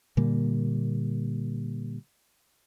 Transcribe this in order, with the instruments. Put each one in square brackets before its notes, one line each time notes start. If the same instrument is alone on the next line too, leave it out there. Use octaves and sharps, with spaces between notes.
[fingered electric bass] A#2 D3 G3 A#3